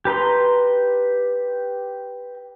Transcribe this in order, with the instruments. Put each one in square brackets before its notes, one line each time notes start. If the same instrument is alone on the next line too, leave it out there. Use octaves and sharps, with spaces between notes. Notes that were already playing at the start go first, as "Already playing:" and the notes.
[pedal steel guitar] G4 B4 A#5 C6